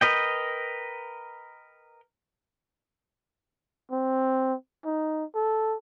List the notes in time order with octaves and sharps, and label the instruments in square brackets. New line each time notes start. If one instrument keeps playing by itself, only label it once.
[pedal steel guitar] A#4 B4 D#5 G5
[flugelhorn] C4
D#4
A4